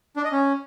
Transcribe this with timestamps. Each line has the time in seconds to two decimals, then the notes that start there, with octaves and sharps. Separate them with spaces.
0.17 D4
0.24 D#5
0.32 C#4